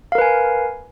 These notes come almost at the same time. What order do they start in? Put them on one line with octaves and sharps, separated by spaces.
F5 A#4 B4 G#5